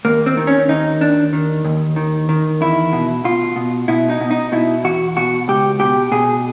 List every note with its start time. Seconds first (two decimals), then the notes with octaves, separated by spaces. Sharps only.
0.05 D#2 A#3
0.26 C4
0.37 D#3
0.47 C#4
0.69 D#2 D#4
1.01 D#2 D4
1.33 D#3
1.65 D#2
1.96 D#3
2.29 D#3
2.61 E2 E4
2.93 B2
3.24 B2 F4
3.56 B2
3.88 B2 E4
4.10 D#4
4.21 B2
4.31 D#4
4.52 B2 E4
4.84 E2 F#4
5.16 B2 F#4
5.48 C#2 G4
5.80 B2 G4
6.12 B2 G#4